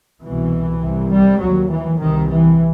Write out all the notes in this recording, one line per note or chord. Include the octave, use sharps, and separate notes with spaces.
C2 B2 E3
C2 C3
G3
D#2 F#3
E3
C2 C3 D#3
E3